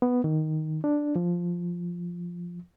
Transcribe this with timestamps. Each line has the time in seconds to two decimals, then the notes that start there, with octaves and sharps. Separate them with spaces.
0.02 B3
0.24 D#3
0.84 D4
1.16 F3